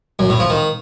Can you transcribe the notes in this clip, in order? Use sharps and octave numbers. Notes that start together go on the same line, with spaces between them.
F#2
A2
F3
D#3